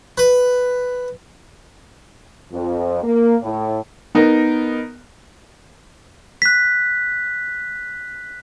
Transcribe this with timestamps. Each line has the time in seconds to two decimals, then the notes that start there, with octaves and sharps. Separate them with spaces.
0.18 B4
2.52 F2
3.03 A#3
3.43 A2
4.15 B3 D#4 A#4
6.42 F#6 B6